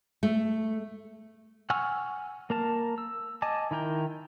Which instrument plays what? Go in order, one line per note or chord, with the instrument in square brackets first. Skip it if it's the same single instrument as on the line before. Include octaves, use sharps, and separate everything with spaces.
[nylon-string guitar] A3
[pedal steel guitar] F#5 G#5 C#6 E6 F6
A#3 A#4 A5
E6
D#5 G#5 A5 D6
D#3 E4 A#4 G5